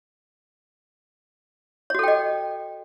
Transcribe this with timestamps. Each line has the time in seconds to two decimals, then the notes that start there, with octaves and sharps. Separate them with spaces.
1.90 C#5
1.95 F#4
1.99 A4
2.03 G5
2.08 D#5